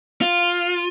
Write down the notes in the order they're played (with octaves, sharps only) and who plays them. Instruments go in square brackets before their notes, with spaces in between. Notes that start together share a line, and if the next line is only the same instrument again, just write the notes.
[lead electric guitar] F4